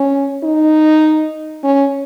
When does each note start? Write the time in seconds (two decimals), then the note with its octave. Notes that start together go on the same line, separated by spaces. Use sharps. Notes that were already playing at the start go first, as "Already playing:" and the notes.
Already playing: C#4
0.43 D#4
1.63 C#4